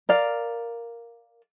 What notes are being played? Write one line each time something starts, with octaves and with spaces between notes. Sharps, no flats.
A#4 D5 F5